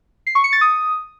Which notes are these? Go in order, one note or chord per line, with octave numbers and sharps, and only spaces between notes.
C7
C#6
C#7
A6
D#6